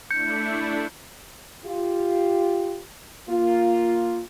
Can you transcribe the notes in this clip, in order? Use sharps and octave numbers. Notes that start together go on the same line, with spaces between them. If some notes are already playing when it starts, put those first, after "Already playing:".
A3 D4 E4 G6 C#7
F4 G4
A#3 F4